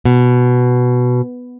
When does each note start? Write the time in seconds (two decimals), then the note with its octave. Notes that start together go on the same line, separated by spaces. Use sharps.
0.05 B2